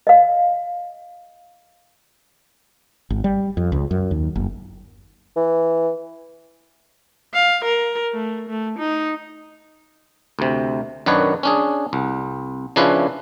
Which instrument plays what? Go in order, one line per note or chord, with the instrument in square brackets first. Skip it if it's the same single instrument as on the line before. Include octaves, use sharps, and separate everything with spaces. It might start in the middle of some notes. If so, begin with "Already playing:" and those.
[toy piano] D#5 F5
[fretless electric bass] G#1
G3
F2
C#2
F#2
D#2
F#1
[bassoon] E3
[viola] F5
A#4
A3
A3
D#4
[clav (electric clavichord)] D2 C3
F#2 D#3 F#3 D4 B4 C#5
C#4 D4 G#4
C2
C#3 F3 C#4 D4 E4 B4